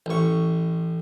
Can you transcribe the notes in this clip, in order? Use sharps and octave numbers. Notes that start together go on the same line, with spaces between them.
A1 C#6